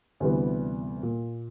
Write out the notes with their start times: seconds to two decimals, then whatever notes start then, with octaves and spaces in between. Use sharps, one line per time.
0.20 D2 C3 E3 G3 B3
1.03 A#2